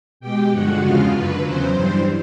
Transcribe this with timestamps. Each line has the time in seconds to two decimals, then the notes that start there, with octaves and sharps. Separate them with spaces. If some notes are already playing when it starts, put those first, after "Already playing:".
0.20 B2 G#3 G4 G5
0.52 G2 D3 F3 G#3 F#4 F#5
0.81 E2 C#3 F3 G#3 F4 F5
1.12 F#2 D3 F#3 B4
1.43 E2 C#3 F#3 C5
1.73 G2 E3 G3